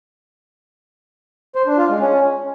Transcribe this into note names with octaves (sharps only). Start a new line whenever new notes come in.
C5
D4
F4
G#3
C#4